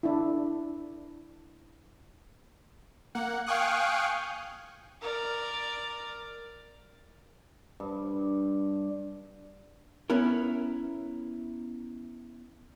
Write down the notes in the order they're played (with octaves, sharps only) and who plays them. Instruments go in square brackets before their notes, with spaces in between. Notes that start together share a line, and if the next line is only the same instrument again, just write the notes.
[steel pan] D4 E4
[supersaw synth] A#3 F#5
F5 G5 G#5 C#6 D#6 F#6
[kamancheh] A#4 D5
[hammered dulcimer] G2
[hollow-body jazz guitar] B3 C#4 E4 A#4